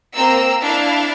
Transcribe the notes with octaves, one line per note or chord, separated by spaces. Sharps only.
A#3 C4 A#5 E6
D4 E4 F5